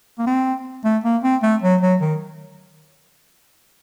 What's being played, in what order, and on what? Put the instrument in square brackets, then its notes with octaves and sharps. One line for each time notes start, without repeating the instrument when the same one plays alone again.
[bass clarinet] A#3
C4
A3
A#3
C4
A3
F#3
F#3
D#3